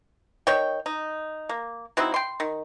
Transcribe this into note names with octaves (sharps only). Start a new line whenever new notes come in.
D#3 C#5 G5
D#4
A#3
F#3 C4 D#4 E4
G5 C6
D#3